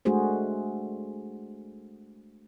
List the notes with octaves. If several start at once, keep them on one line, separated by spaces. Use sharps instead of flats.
G#3 A3 D4 F#4 G#4 C5